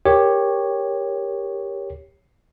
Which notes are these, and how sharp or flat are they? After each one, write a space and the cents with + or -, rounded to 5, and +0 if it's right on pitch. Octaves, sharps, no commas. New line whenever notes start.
G4 +15 A#4 +5 C#5 +0